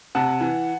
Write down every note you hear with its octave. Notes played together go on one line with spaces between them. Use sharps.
C3 F#5 A5
E3